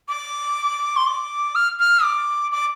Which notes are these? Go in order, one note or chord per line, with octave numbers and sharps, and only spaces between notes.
D6
C6
D6
F6
F6
D6
D6